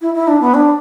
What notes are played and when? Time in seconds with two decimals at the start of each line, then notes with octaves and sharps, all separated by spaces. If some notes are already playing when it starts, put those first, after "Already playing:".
0.02 E4
0.15 E4
0.28 D4
0.41 B3
0.54 D4